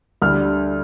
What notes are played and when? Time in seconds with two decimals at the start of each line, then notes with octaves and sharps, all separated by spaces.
0.21 D2 D3 G3 F6